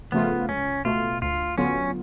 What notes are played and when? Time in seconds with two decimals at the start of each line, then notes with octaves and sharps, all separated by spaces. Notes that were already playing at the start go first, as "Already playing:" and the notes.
0.12 C#3 F3 A3 B3 F4
0.48 C#2 C#4
0.85 B2 A3 F4
1.22 D2 F4
1.58 D3 F#3 B3 C#4 F4